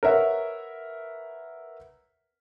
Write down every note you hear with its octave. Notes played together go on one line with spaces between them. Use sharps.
A#4 B4 C#5 E5 F#5